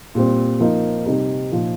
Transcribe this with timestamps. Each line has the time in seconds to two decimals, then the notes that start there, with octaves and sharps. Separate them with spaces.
0.15 A#2 G3 C4
0.60 F3 A#3 D#4
1.06 C3 G3 D#4
1.52 A#2 F3 D#4